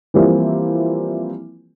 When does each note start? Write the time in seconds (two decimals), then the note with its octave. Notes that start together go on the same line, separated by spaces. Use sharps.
0.14 E3 F3 G3 A#3 C4 E4